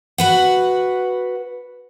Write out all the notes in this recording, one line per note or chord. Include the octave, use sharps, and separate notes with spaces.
F#4 B4 F#5